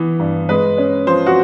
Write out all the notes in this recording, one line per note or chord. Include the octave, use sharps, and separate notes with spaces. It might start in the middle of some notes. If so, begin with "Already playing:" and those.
Already playing: E3 B3
G2
G#3 B4
C#4
F3 C5
F#4